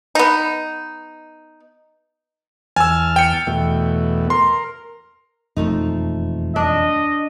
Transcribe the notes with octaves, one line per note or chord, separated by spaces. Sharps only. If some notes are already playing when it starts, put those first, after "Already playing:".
B3 D#4
E2 G#5 A5 E6 F6
G5 C#7
E2 B2 A3
A#4 C6
E1 F2 D#3 F3 A3 D#4
D4 D#5